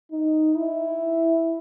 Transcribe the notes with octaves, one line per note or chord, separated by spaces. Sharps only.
D#4
E4